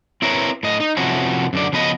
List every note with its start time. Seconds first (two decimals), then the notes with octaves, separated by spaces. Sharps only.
0.22 C4 E4 A#4 B4 C#5
0.63 A2 D#5
0.80 D#4
0.97 C3 F3 C#4 E4 F#4
1.53 F#2 D3 D5
1.73 C#3 F3 B3 B4 D#5